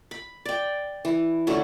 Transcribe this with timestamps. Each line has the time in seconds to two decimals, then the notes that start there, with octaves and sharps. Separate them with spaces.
0.11 B5
0.46 D5 G5
1.05 E3
1.47 D3 F#3 A3 C#4